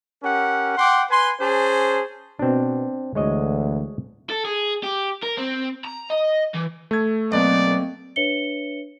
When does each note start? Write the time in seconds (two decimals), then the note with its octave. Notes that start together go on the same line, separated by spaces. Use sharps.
0.23 C#4 G4 A#4 F#5
0.77 F#5 G5 C6 D6
1.10 B4 G#5 C6
1.39 C#4 G#4 C5 A5
2.39 B2 C4 D4
3.15 D2 E3 G#3 C#5 D#5
4.30 A4
4.45 G#4
4.83 G4
5.23 A#4
5.37 C4
5.85 A#5
6.10 D#5
6.54 E3
6.91 A3 A4 G#6
7.32 B1 A#3 C4 D5 D#5
8.16 D4 B4 C#5 E5 C#7 G7